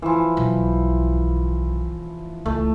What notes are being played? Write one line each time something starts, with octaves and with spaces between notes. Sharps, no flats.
E3 F3
B1
C#2 A3